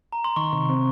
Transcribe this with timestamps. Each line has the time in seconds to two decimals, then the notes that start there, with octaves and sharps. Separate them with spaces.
0.13 A#5
0.24 C6
0.36 D#3 C#6
0.53 C3
0.69 C4